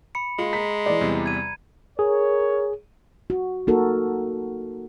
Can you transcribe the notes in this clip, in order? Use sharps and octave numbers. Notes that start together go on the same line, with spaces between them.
B5 C#7
G#3 F4
A#5 B6
E3 D5
E2 C3 G3
G#6 D#7
G#4 A#4 C#5
F#4
A#3 D#4 F#4 A4 A#4